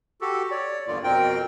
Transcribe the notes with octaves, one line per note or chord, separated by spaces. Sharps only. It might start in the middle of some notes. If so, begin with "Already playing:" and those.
F#4 G4 A4
C#5 D5
E2 G2 D3 A#3 F4 D5
F2 B2 C4 A#4 G5